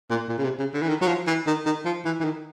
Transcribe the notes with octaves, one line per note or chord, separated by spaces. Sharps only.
A#2
A#2
C#3
C3
C#3
D3
E3
D#3
F#3
F3
E3
D#3
D#3
F3
E3
E3
D#3